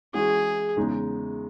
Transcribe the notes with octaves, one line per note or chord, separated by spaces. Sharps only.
E3 G#3 C#4 F#4 G#4
E2 C#3 G#3 D#4